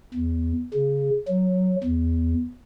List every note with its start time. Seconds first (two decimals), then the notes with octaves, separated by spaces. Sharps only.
0.14 E2
0.73 C#3
1.28 F#3
1.83 E2